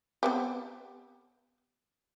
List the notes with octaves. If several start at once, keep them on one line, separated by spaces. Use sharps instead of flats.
B3 C4 G4